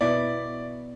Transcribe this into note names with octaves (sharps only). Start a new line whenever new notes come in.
B2 B3 E4 D5